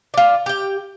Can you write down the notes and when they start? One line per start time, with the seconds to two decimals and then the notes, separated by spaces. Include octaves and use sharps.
0.14 F4 D5
0.46 G4 G5